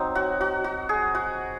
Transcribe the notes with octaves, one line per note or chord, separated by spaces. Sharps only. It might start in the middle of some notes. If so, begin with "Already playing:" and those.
Already playing: F#3 C4 D#4
F#4
F#4
F#4
G#4
F#4